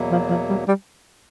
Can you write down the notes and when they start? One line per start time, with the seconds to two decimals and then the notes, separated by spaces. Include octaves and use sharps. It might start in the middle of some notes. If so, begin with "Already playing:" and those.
Already playing: E2 B2 F#3 A#3
0.12 F3
0.30 F3
0.50 G3
0.68 G3